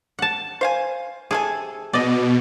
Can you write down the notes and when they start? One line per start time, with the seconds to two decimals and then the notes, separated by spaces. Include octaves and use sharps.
0.19 F#5 A5
0.61 C5 F5 G#5
1.31 C3 G#4 A4 G#5
1.93 B2 D5 D#5